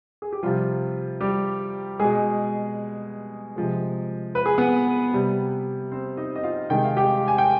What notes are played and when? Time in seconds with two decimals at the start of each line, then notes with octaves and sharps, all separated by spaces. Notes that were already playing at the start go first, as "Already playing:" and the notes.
0.22 G#4
0.32 G4
0.43 C3 F3 G3 F4
1.21 G3 G4
1.99 B2 G#3 G#4
3.56 C3 F3 G#3
4.35 B4
4.46 G#4
4.58 B3 B4
5.13 C3 G3
5.92 C4 C5
6.17 D#4 D#5
6.36 D#5
6.43 F4 F5
6.70 C3 D#3 G#3 G5
6.84 F5
6.97 G4 G5
7.28 G#5
7.38 G5